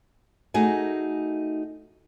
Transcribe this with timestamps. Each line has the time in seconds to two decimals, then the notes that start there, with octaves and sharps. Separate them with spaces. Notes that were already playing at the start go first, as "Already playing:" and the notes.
0.54 A3 D#4 F#4 G#4 G#5